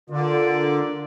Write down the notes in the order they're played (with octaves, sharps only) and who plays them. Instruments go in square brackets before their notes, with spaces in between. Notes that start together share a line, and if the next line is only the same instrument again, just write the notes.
[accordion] D3 [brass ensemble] F4 A#4 D5